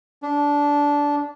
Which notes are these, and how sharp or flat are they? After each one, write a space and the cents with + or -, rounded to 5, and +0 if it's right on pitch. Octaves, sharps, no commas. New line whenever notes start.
D4 -15